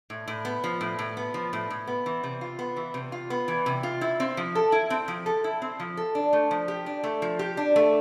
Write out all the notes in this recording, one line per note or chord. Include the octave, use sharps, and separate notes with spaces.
A2
A2
B3
F3
A2
A2
B3
F3
A2
A2
B3
E3
C3
F4
B3
E3
C3
F4
B3
E3
C3
F4
E4
C4
F3
A4
E4
C4
F3
A4
E4
C4
F3
A4
D4
A3
F3
G4
D4
A3
F3
G4
D4
A3